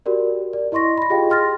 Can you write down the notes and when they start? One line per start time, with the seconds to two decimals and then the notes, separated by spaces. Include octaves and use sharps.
0.06 F#4 G4 A#4 D5
0.53 D5
0.72 E4 D#5 C6 C#6 A#6
0.98 B5 A#6
1.10 F4 G4 G#4 D#5 F5 G5
1.30 C6 F6 A6 A#6